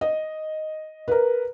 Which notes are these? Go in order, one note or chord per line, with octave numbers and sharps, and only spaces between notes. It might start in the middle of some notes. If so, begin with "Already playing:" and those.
D#5
A#4 B4